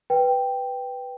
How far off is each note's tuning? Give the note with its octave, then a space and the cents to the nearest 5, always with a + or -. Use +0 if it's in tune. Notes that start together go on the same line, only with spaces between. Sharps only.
B4 +0 G5 +0